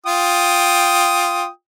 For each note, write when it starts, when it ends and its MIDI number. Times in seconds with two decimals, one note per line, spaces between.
0.06 1.48 65
0.06 1.48 79
0.06 1.48 87